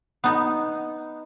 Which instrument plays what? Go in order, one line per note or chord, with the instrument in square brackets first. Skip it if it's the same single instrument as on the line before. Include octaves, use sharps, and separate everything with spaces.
[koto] B3 D#4